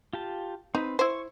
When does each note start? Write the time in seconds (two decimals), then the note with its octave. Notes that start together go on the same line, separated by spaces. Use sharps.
0.13 F4 G4 A5
0.75 C4 D#4 B4
0.99 E4 C5 C#6